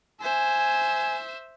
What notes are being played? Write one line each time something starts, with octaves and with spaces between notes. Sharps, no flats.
C5 E5 G#5